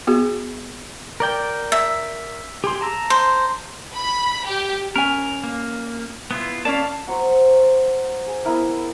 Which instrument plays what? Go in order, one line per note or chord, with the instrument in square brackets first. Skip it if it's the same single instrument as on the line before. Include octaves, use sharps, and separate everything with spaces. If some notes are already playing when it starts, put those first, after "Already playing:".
[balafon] B3 F#4 G#4
[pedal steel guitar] A#4 D5 G5
[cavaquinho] E5
[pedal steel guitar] G4 G#4 C6
A5 A#5 E6
[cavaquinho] C5
[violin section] B5
G4
[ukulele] C#4 G#5 [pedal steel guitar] A#4
[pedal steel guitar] A#3
B3 E4 F4
[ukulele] C#4 C#5 D5 [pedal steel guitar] F5 A5
[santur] F#3 C5 F#5
G#4
B3 E4 A#4